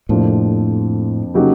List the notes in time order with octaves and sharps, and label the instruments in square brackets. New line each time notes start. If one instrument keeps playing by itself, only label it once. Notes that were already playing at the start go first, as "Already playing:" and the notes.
[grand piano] F2 C3 F3 A#3 D4 [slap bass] A2
[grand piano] C#3 F#3 A#3 D#4 G4